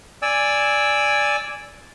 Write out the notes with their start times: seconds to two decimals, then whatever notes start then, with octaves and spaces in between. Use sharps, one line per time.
0.22 D5 G#5 E6